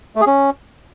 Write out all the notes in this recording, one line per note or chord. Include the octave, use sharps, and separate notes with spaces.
A3
G#4
C#4